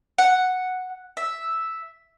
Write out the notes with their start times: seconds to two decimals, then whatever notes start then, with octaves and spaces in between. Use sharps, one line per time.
0.18 F#5
1.17 E5